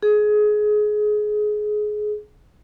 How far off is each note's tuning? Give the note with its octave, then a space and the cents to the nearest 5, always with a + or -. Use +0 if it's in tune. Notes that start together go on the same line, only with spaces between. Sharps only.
G#4 +20